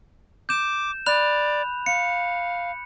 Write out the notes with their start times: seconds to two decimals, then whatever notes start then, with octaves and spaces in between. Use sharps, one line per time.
0.49 D6 G6 E7
1.06 D5 B5 F#6 F7
1.86 F5 C#7